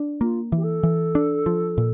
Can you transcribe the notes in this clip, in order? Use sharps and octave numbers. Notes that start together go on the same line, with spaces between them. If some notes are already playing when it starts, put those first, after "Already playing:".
Already playing: D4
A#3 F4
E3 G4
A4
E3
D4
F3
A#2